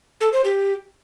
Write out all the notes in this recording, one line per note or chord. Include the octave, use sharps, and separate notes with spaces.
A4
C5
G4